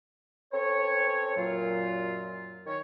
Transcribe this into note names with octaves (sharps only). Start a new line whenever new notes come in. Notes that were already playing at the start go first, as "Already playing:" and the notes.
C4 C#4 A4 B4 C#5
F#2 A#2 F#3 F4
D#3 C#5